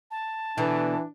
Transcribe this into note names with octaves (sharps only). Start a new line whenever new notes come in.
A5
B2 D3 E3 B3 D4